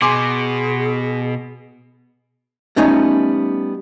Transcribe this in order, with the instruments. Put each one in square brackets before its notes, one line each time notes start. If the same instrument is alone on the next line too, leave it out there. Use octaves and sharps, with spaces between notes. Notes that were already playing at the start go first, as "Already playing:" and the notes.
[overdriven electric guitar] B2 [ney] G#4 [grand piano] G#5 C6 D6
[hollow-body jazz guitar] G3 A3 B3 C#4 D#4